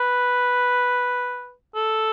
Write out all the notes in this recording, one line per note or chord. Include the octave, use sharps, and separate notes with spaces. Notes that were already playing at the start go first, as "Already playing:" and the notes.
Already playing: B4
A4